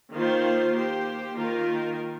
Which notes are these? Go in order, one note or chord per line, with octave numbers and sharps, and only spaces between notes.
D#3 A#3 F4 C5
A#3 G4 C5
D#3 A#3 F4 A#4